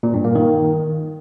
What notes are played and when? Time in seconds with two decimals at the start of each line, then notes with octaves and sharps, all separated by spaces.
0.03 A#2
0.14 G2
0.25 A#3
0.35 D#3